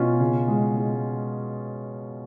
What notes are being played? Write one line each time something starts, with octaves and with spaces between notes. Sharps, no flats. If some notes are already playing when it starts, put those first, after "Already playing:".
Already playing: B2 C#4 F4
C#3
G#3
G#3